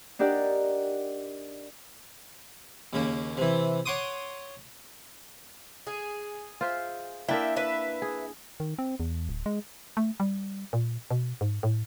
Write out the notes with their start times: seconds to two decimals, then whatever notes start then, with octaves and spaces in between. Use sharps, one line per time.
0.19 D4 D#4 G4 A#4 D5 F#5
2.93 D#2 C#3 A#3
3.37 C3 E3
3.86 C#5 F#5 C6 D6 D#6
5.87 G#4
6.61 F4 C5 E5
7.28 A#3 D4 E4 E5 G5
7.56 B4 E5
8.02 G#4
8.60 D#3
8.79 C4
9.00 E2
9.29 D1
9.46 G#3
9.97 A3
10.20 G3
10.73 A#2
11.11 B2
11.41 G#2
11.63 A2